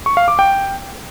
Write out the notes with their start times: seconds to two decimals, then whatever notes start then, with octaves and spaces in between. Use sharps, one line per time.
0.06 C#6
0.17 F5
0.28 D6
0.39 G5